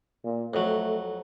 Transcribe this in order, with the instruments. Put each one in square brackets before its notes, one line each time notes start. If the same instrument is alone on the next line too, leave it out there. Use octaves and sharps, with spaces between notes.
[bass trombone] A#2
[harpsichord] F2 F#3 [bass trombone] A3